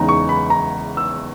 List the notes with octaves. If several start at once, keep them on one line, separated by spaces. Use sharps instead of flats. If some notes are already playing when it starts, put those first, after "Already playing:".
Already playing: E2 C#3 G#3 D#4 A#5
C#6
B5
A#5
E6